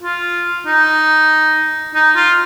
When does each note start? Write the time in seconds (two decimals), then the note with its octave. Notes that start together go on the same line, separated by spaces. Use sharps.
0.02 F4
0.66 D#4
1.95 D#4
2.16 F4